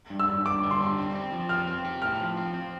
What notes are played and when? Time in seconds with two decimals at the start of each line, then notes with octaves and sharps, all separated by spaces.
0.10 G2
0.20 E6
0.27 G2
0.45 G2 D6
0.63 D3
0.71 C6
0.80 G3
0.97 C4
1.15 C4
1.33 F3
1.49 C4 F6
1.67 C4
1.85 G4
2.02 A2 F6
2.19 F3
2.37 C4
2.54 C4